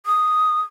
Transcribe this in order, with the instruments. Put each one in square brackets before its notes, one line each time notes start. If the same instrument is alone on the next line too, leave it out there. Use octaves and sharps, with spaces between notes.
[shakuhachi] D#6